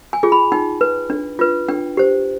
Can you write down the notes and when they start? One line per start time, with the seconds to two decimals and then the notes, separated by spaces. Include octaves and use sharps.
0.13 G#5
0.23 F4 G#4
0.32 B5
0.52 D#4 G5
0.81 B4
1.10 D4
1.39 F4 B4
1.69 D4 G5
1.97 G4 C5